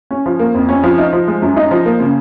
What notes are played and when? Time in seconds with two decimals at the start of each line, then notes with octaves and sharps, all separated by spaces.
0.11 C#4
0.26 F3
0.39 A#3
0.54 F2
0.69 C#4
0.84 F3
0.98 D#4
1.13 F3
1.28 G#3
1.42 F#2
1.56 D#4
1.71 F3
1.85 A#3
2.00 C#3